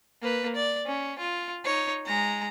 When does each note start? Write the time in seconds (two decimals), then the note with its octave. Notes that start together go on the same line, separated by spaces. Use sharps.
0.22 A#3 B4
0.56 D5
0.86 C#4
1.19 F4
1.64 D#4 C#5
2.06 G#3 A#5